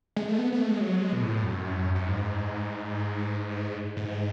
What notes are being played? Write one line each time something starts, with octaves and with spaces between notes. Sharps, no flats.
G#3
A3
B3
B3
A3
G#3
F#3
G#3
B2
A2
F#2
F#2
G#2
G#2